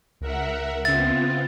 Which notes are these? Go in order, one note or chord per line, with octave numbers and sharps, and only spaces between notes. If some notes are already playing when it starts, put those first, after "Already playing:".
C#2 A#4 E5 F#5
C#3 B3 C4 F4 E5 A6